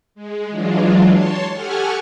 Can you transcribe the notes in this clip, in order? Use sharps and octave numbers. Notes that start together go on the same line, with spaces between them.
G#3
E3 F#3 G#3 D4 F4
C#5 A5 C6
G4 A4 F#5 G#5 C#6 F6